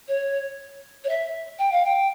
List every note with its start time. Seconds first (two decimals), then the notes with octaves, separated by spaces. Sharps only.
0.08 C#5
1.04 C#5
1.09 E5
1.59 G5
1.72 F5
1.85 G5